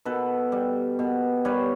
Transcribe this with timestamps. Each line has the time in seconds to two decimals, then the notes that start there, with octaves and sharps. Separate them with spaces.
0.05 B2 A4 B4
0.52 G3
0.99 B2
1.45 G3 B4 C#5